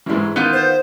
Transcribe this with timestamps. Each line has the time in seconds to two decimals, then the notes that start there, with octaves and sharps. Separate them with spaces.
0.06 A1 G#2 E3 E4
0.36 D#3 B3 F4 C6 G6
0.53 C5